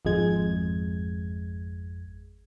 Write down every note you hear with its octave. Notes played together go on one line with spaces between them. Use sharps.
G#1 F2 G#3 G#6